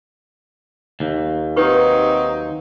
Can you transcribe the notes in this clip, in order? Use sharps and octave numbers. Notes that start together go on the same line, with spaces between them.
D#2
F#3 C4 D#4 G4 B4 C#6